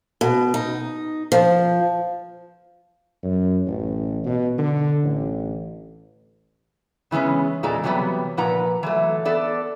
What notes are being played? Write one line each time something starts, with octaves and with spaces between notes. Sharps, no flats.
B2
D#4
F3
F#2
A1
B2
D3
A1
C#3 E3 G#3 B3 C#4
E2 A#2 G#3 A4 D5 A#5
C3 E3 F#3 G3 B3
A#2 F3 B4 F#5 A#5
E3 F#3 A3
B3 A4 D5